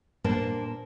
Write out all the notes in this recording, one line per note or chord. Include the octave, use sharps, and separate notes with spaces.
A#2 A#3 D4 A#4 C5 A5